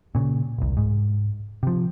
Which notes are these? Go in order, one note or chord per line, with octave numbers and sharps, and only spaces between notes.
A#2 C#3
E1 C2
G#2
C3 F3